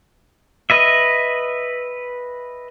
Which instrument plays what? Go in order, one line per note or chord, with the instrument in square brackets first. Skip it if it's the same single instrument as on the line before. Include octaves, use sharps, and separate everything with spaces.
[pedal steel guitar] B4 D#5 E5